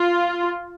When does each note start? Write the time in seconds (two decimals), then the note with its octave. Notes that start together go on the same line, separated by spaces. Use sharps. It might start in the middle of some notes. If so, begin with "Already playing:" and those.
Already playing: F4